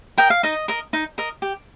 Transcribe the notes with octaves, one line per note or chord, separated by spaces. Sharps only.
A#4 D#5 G5
F5
D#4 D#5
A#4 D#5
D#4
A#4 D#5
G4